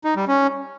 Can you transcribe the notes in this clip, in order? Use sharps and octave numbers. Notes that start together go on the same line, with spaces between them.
D#4
G3
C#4